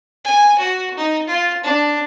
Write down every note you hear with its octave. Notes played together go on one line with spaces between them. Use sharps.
G#5
F#4
D#4
F4
D4